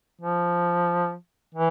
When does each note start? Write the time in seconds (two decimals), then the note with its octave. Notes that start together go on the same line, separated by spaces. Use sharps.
0.21 F3
1.54 E3